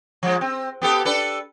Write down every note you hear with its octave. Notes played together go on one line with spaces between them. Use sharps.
F3 G#3
C4
B3 G4 A4
D4 A4 B4